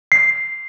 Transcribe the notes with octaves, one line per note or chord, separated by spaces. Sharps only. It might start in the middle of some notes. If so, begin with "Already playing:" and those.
C7